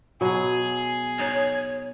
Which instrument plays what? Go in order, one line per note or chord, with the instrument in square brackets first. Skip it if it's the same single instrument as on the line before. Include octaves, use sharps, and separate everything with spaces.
[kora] B2 F#3 [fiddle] G#4
[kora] D#4 [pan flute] C#5